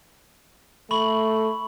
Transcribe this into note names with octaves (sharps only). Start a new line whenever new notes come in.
A3 B5 C#6 F#7